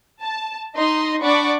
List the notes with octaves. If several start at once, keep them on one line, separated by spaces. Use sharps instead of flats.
A5
D#4 D#5 C6
D4 D5 F#5 B5 C#6 D6